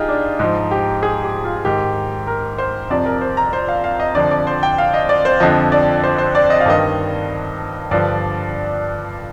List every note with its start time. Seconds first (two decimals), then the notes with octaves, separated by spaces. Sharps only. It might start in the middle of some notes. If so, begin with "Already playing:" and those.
Already playing: D#4 F4 G4 G#4
0.08 D4
0.39 G#2 F3 D#4
0.71 G4
1.03 G#4
1.23 G4
1.44 F4
1.56 F4
1.65 G#2 D#3 G4
2.27 A#4
2.58 C5
2.90 F2 C3 F3 D5
3.05 A#4
3.21 C5
3.37 A#5
3.53 C5
3.68 F5
3.84 F5
4.00 D#5
4.15 F2 D3 F3 D5
4.31 D5
4.47 C5
4.63 G5
4.78 F5
4.94 D#5
5.09 D5
5.25 C5
5.40 F2 D3 F3 D#5
5.72 D5
6.04 C5
6.18 C5
6.35 D5
6.50 D#5
6.60 F5
6.66 G2 D#3 D#5
7.91 G2 D3 F3 D5